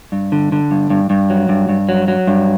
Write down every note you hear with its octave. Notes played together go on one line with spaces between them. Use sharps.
G2
D3
D3
G2
G2
G2
F#3
G2
G2
F#3
F#3
G2